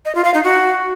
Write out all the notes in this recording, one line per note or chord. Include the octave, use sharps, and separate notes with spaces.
D#5
F4
F5
D#4
F#4